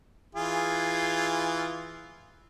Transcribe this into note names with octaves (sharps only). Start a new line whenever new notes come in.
E3 F4 G#4